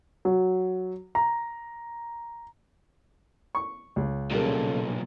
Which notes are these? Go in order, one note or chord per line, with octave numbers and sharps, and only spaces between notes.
F#3
A#5
C#6
C#2
B1 A#2 C#3 G3 A4 A#4